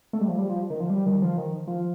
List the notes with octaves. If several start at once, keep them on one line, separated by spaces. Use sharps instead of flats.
A3
G3
F3
G3
F3
D#3
F3
G3
D#3
F3
D#3
F3